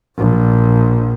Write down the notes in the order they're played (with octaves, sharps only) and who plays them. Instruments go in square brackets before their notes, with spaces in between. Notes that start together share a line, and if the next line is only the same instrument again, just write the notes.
[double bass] A#1